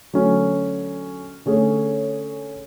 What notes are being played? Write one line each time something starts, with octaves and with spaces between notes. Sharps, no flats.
D3 F#3 A3 C#4
D3 A3 C#4 G#4 C#5